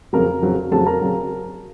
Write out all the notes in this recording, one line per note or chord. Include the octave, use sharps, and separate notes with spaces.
F2 C#3 F#3 A#4 A#5
F2 C#3 F#3
F2 C#3 F#3 A4 A5
A#4 A#5
C#3 F#3